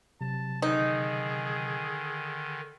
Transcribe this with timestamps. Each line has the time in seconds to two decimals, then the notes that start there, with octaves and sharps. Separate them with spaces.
0.21 C3 F#3 A5
0.62 D3 D#3 D#4 G#4